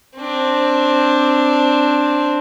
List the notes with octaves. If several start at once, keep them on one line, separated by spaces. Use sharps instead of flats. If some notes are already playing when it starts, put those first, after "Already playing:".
C4 D4